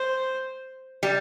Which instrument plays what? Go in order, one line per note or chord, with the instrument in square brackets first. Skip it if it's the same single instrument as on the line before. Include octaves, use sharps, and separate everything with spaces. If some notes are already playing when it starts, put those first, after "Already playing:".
Already playing: [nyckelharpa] C5
[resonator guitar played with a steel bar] G3